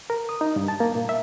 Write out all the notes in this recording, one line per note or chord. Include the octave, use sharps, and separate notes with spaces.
A#4
D#6
D#4
G2
A5
A#3
A#2
E5